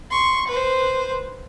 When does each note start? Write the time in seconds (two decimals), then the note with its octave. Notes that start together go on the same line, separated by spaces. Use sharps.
0.11 C6 C#6
0.47 B4 C5